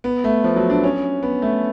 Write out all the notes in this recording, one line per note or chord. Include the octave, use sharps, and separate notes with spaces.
B3
A3
F3
F#3
D4
C#4
B3
A3